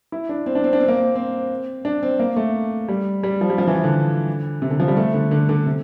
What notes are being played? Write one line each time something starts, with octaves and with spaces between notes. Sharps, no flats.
E4
D4
C4
D4
C4
D4
C4
A#3
C4
C4
D4
C4
A#3
A3
G3
G3
F3
G3
F3
E3
F3
D3
C3
D3
F3
G3
A3
D3
D3
D3
C3